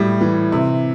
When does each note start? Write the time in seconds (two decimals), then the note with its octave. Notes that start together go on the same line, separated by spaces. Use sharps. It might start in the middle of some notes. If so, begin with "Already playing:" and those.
Already playing: A2 G3 E5
0.21 E3
0.52 C3